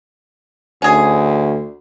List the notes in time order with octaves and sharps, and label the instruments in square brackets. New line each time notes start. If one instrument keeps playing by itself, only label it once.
[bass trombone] D2 [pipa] C#4 G#4